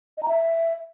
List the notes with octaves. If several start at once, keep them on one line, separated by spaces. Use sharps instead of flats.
D#5
A#5
E5